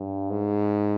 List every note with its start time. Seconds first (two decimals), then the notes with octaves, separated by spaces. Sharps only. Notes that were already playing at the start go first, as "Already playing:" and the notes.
Already playing: G2
0.30 G#2